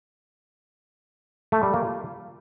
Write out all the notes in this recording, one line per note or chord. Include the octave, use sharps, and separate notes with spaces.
A3
G3
A#3
F4